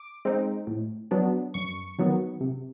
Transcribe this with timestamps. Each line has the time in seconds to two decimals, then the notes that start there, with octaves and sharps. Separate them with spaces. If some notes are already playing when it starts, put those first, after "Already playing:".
Already playing: D6
0.25 G#3 C4 D#4
0.67 A2
1.11 F#3 B3 D4
1.54 F#2 C#6
1.99 D#3 F#3 B3
2.41 C3